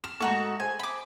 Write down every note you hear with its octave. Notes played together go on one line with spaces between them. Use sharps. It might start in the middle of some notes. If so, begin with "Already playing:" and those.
F6 E7
G#2 A3 D#4 F#4 A4 C#6
G#4 C5 G#5
B5 D6